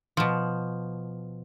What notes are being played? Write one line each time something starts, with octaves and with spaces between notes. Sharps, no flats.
B2 F3